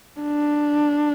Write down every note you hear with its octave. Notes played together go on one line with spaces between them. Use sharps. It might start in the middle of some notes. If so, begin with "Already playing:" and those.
D4